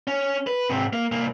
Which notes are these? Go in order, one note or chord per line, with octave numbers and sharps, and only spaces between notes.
C#4
B4
G#2 C3
A#3
C2 A#3